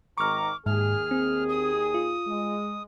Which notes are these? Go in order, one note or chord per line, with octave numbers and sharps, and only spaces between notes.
G#1 D#3 A#5 C#6 D6 F6
D#2 G#2 G#4 F6
C4
D#6
F4
G#3